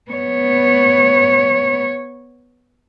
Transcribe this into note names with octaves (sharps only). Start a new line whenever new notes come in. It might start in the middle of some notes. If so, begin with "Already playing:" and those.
B3 C#5